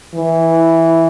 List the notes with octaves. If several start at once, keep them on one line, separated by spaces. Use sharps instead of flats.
E3